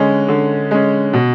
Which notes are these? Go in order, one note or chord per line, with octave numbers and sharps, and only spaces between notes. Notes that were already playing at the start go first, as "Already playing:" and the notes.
Already playing: D3 G#3 C#4
D3
G#3 C#4
B2